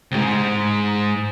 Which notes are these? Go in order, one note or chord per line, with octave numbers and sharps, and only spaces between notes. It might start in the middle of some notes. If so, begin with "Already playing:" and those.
C2 G#2